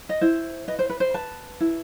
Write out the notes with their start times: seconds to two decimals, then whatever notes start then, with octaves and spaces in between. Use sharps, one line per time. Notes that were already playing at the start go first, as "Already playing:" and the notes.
0.09 D#5
0.21 E4 C5
0.68 B4 D#5
0.79 C5
0.90 B4
1.00 C5
1.14 B4 A5
1.60 E4